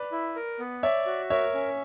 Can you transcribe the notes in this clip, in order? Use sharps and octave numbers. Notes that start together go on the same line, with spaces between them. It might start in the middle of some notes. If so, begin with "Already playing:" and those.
Already playing: B4 D5
E4
A#4
B3
C#5 D5 E5
F#4
A#4 C#5 E5
C#4